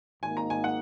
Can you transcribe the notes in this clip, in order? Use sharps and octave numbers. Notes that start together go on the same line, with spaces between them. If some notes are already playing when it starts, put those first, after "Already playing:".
G#1 G#2 D#3 A#3 D#4 G#5
A#5
G#5
F#5